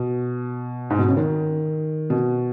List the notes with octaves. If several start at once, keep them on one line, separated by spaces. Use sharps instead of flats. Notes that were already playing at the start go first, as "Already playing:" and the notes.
Already playing: B2
G#2
B2
C#3
D#3
B2